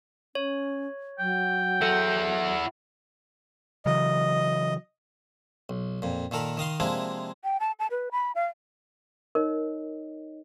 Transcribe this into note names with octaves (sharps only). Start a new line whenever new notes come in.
C#4 C#5
F#3 G5
E4 A4 F#5
C#3 E3 F#3 D#5
B1
F2 A#2
A#2 D#3 A4 A#4 B5
D#3 D#5 F5 C6
C3 F3 G#3 A#3 D4 E4
G5
A5
A5
B4
B5
F5
D#4 A#4 C#5 D#5